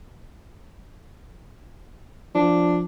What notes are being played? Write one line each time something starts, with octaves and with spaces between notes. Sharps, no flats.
F3 D4